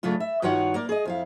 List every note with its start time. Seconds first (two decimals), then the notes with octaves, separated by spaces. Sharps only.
0.03 C#3 F#3 A3 D4 F4
0.20 E5
0.42 G2 D#3 F4 F#4 C#5 F#5
0.74 A#3 A#4 D5
0.89 G#4 D#5
1.05 F2 E4 F5